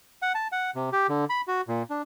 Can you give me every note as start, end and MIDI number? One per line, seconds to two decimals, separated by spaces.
0.22 0.33 78
0.35 0.48 81
0.52 0.71 78
0.75 0.90 48
0.93 1.07 67
1.09 1.25 50
1.30 1.41 83
1.48 1.61 66
1.68 1.83 46
1.90 2.02 62